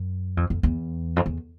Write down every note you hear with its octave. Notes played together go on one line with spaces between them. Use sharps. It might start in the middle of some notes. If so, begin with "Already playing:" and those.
Already playing: F#2
F2
F2
E2
F2
E2